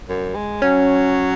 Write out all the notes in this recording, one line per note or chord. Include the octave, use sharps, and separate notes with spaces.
F#2
G#3
F#3 C#4